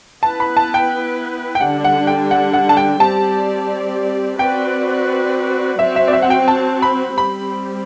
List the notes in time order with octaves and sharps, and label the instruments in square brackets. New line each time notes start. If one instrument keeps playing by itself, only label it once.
[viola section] B3 E4 B4 [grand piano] A5
[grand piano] B5
A5
G5
G5
[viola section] D3 G3 D4 [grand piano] F#5
[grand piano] F#5
G5
F#5
F#5
A5
G5
[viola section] G3 C4 G4 D5 [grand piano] A5
[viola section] C4 F#4 B4 D5 [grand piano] G5
[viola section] F#3 C4 F#4 [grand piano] E5
[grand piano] E5
D5
E5
F#5
G5
A5
B5
[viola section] G3 C4 G4 [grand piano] B5